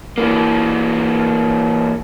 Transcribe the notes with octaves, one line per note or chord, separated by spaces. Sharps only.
E3 A#3